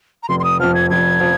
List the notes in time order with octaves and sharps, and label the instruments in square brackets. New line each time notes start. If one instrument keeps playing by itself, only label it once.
[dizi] A#5
[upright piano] F1 [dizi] C6
[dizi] C6
D#6
[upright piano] F2 F3 [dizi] F6
[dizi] G#6
[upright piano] F1 [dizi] G#6
[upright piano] F3